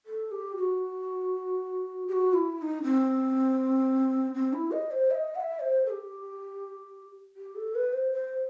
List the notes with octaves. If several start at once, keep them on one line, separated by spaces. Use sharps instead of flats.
A4
G4
F#4
G4
F#4
E4
E4
D#4
C4
C4
E4
D#5
C5
E5
D#5
F#5
E5
C5
A4
G4
G4
A4
B4
C5
C5